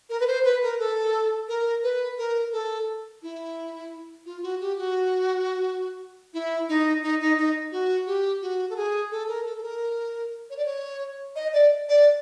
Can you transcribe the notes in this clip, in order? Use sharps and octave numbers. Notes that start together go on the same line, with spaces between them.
A#4
B4
C5
B4
A#4
A4
A#4
B4
A#4
A4
E4
F4
F#4
G4
F#4
E4
D#4
D#4
D#4
D#4
F#4
G4
F#4
A4
G#4
A4
A#4
A4
A4
A#4
C#5
D5
C#5
D#5
D5
D5